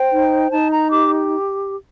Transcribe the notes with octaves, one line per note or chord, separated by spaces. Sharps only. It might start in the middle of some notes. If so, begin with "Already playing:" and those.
Already playing: C5 G5
D#4
D#4 A5
A#5
G4 D6